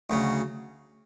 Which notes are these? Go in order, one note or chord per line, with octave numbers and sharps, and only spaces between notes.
D2 C#3 F#3